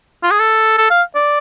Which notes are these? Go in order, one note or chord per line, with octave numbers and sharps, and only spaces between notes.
F4
G#4
A4
A4
F5
D5